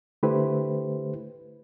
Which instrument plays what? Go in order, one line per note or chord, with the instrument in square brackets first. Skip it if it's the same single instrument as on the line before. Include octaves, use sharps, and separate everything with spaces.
[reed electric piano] D3 A3 E4 G4 B4 C5